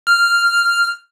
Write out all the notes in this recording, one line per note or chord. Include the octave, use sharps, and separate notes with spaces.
F6